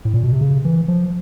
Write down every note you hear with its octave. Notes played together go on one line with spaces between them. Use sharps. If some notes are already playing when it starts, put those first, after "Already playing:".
A2
A#2
B2
C3
C#3
E3
F3